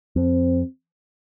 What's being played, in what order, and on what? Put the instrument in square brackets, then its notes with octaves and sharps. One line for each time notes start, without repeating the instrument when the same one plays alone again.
[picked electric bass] F2 [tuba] C4